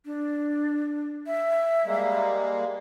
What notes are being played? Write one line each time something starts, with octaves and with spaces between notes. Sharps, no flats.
D4
E5
G3 G#3 A#3